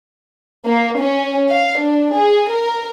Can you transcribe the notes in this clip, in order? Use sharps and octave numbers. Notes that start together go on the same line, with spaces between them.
A#3
C#4
F5
D4
G#4
A#4